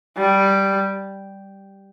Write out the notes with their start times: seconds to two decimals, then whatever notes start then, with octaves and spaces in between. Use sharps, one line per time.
0.17 G3